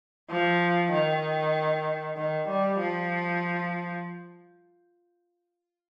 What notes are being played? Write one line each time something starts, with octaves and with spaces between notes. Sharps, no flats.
F3
D#3
D#3
G3
F3